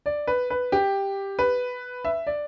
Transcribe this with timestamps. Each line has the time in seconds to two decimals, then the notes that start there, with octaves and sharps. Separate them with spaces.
0.06 D5
0.27 B4
0.50 B4
0.72 G4
1.39 B4
2.05 E5
2.27 D5